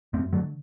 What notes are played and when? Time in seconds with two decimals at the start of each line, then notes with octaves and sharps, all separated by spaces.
0.13 F#2 A3 C4
0.33 D3 F#3 A3